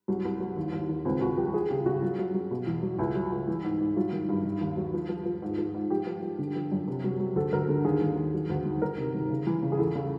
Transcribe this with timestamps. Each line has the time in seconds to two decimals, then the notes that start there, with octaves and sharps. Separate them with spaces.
0.08 C2 F#3
0.25 C2
0.40 F#3
0.57 D#2
0.72 D#2
0.89 D#2
1.05 C#2 C4
1.21 C#2 F#4
1.37 F3 G4
1.53 F3 G#4
1.70 C#3 G4
1.86 C#3 F#4
2.01 F#3 F4
2.19 F#3
2.34 F#3
2.51 B2
2.67 E2
2.83 F#3
2.99 C#2 E4
3.15 F#3
3.31 C#2
3.48 E3
3.63 G#2
3.80 G#2
3.96 F#3 F4
4.12 D#3
4.29 G2
4.44 D#3
4.61 D#2
4.77 F#3
4.94 F3
5.09 F3
5.25 F3
5.42 G#2
5.58 F3
5.74 G#2
5.90 F3 G4
6.07 F3
6.22 F3
6.38 D3
6.56 F3
6.72 F#2
6.88 C3
7.04 F#3
7.20 F#3
7.36 D2 A4
7.53 D2 A#4
7.68 D3 A4
7.85 D#2 G#4
8.01 D#2
8.16 D#2
8.34 F#3
8.50 D2
8.65 D#3
8.82 D#3 A#4
8.97 C3
9.15 D#3
9.30 C#3
9.47 E3
9.62 C#3
9.72 G#4
9.79 E2 A4
9.95 C#3